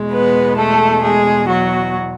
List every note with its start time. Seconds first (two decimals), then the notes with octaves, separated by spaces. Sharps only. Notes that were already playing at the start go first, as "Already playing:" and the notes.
Already playing: E2 B2 G#3
0.12 B3 B4
0.58 A3 A4
1.03 G#3 G#4
1.49 F#3 F#4